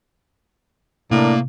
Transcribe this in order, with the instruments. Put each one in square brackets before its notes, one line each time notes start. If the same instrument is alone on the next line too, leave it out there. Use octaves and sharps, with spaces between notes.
[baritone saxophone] A2 [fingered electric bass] C3 [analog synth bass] A#3 [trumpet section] D4 A#4 D5